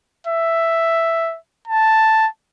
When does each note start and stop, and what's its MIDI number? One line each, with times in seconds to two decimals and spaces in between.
0.27 1.38 76
1.68 2.28 81